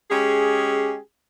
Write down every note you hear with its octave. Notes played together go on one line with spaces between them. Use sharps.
G#3 C#4 G4 G#4